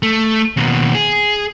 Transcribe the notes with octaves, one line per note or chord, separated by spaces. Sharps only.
A3
D#2 B2
G#4